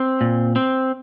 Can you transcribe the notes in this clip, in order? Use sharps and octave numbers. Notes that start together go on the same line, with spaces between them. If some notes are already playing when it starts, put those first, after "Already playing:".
Already playing: C4
A#2
C4